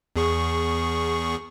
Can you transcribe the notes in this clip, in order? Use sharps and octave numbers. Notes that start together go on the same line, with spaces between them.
E2 G#4 C#6